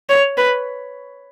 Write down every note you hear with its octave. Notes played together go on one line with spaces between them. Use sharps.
C#5
B4